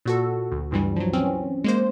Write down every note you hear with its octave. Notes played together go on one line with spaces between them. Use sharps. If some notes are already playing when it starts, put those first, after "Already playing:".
A#2 F#4 A4
D2
C#2 G2 E3 G3
F3 F#3
E3 C4 C#4
G#3 A#3 C5